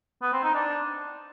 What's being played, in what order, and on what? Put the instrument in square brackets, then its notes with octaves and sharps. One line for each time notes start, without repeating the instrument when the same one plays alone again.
[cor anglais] B3
C4
D#4
D4